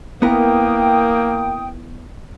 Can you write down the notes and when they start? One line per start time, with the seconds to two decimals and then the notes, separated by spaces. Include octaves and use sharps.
0.22 A#3 B3 E4 A#4 G5 D#6